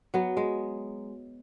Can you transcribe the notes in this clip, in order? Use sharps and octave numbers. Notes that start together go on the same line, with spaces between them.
F#3 B3
G#3